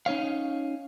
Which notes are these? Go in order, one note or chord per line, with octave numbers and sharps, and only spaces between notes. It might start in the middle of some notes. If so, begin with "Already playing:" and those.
C#4 D#4 C#5 F5